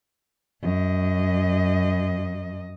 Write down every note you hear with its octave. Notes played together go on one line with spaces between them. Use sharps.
F#2 D#5